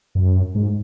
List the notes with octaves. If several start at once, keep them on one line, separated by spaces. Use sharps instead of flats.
F#2
G#2